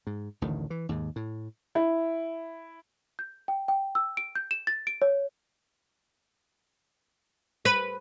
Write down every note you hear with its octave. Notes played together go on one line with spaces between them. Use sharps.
G#2
A1 D2 A2 D#3
E3
D#2 G#2
A2
E4
G6
G5
G5
E6
D7
G6
E7
A6
D7
C#5
B4